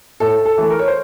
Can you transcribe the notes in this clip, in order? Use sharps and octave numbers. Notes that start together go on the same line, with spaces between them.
A2 A4
A4
E3 A3
A#4
C#5
C5